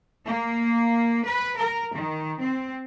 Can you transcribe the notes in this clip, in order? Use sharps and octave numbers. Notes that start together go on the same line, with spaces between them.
A#3
B4
A#4
D#3
C4